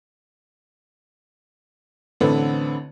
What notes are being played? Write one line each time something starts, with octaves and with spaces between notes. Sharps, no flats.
A1 D3 C4 A4 B4